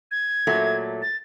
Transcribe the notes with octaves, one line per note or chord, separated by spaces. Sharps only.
G#6
A#2 F#3 A3
A6